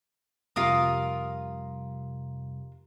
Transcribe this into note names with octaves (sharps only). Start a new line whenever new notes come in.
F2 C3 G3 F4 A#4 D#6